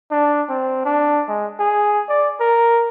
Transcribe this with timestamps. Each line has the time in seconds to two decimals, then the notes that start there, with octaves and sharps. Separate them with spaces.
0.11 D4
0.49 C4
0.85 D4
1.28 G#3
1.59 G#4
2.09 D5
2.40 A#4